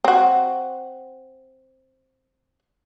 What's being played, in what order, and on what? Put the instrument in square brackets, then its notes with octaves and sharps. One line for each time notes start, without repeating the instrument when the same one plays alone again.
[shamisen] C4 F#4